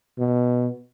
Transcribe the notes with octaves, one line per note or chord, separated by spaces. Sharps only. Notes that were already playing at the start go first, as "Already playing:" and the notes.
B2